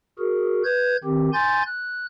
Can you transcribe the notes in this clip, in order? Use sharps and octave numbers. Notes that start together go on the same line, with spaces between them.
F#4 G#4 A#4
B4 G6 G#6
D#3 C4 G4
G#5 C6 G6 A6
F#6